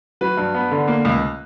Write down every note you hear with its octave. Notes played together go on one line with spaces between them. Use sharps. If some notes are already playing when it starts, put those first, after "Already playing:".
F#3 B4
G2
B3
D3
A#3
C#2